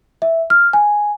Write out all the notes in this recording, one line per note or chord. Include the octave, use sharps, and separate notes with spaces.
E5
F6
G#5